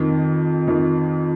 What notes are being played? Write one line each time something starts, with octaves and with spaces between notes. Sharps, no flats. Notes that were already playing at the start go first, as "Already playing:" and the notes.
Already playing: F2 D#3
F2 D#3